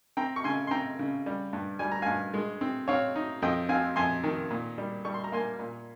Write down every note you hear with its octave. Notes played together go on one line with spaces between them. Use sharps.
C4 G5 A#5
C#6
C#3 G#5 C6
C6
C4 G5 A#5
C#3
G3
G2
G3 G#5
A#5
G2 F5 G#5
G#3
C4
C4 C#5 F5
D#4
F2 D#5 G5
C4 F5 G#5
F2 G#5 C6
D#3
A#2
G3
G3 C#6
C6
A#5
A#3 G#5 C6
A#2